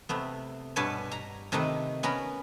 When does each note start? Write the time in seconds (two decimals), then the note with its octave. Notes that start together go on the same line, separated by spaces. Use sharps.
0.09 C3 A3 B3
0.76 G2 B2 B4 C#5 G#5 A5
1.11 A#5
1.52 C3 D#3 A3 D#4 B4
2.03 B3 C#4 A#4 A#5 B5